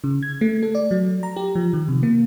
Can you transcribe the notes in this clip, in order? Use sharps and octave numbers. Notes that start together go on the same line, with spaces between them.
C#3
G#6
A3
A4
D5
F#3
A#5
G4
F3
D#3
C3
A#3